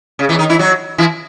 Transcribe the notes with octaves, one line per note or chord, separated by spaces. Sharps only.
C#3
E2 E3
D#3 D#4
E3 E4
F#3 F#4
E3 E4